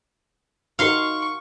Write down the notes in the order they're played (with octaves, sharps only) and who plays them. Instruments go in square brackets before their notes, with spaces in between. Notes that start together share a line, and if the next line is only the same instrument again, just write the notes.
[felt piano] D#4 F#4 A#4 [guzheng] F5 C6 [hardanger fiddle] C#6